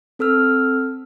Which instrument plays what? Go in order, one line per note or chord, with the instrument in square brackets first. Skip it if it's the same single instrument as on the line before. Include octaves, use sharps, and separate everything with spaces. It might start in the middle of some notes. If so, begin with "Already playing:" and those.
[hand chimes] C4 A4 E6 F6